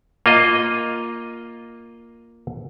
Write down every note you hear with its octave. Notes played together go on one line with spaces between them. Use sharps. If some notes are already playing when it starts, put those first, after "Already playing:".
A#3 F4 D#5